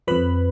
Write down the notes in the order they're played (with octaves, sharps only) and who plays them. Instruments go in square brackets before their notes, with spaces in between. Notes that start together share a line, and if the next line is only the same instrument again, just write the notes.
[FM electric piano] F2 F3 B4 B5